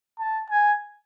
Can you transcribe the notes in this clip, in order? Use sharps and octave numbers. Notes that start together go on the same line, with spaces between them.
A5
G#5